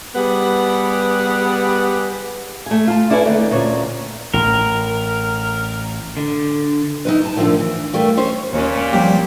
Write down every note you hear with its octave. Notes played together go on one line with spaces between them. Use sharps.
G3 B3 G4 G#4 B4 F#5
A3 G#5
F4 A5
D4 E4 B4 C#5 E5 G#5
D#2 D3 A3 C4
D2 A#2 C#4 C#5
A1 A2 A#4
D3
D#4 E4 B4
A5 A#5
A#2 D3 D#3 F3 A3 A#3
E3
A#2 E3 G3 A3 A#3
C#4 C5 C#5
D#2 A#2 C#4
F3 G3 A#3 C4 G4 C5